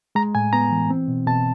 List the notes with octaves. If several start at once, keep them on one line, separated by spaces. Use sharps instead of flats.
G#3 A#5
A2 G#5
B3 A#5
E3
C4
B2
B2 A5